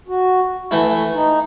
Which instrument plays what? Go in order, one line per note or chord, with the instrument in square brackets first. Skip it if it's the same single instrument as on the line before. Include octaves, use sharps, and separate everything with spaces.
[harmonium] F#4
[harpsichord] E3 A3 E4
[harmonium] D#4